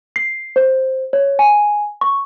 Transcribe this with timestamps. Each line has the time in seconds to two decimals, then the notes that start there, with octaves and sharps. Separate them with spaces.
0.16 C7
0.56 C5
1.13 C#5
1.39 G#5
2.01 C#6